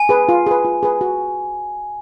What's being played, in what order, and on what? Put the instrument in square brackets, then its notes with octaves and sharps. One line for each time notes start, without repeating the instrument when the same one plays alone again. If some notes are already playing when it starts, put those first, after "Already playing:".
Already playing: [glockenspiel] G#5
[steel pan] G#4 B4
F4
G#4 B4
F4
G#4 B4
F#4